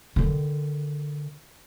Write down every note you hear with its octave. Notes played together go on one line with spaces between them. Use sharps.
D3 D#3